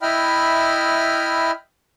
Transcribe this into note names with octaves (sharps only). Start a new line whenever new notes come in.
E4 D#5 E5 G5 B5 F6